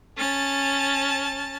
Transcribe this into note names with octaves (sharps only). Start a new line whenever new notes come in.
C#4 A5 A6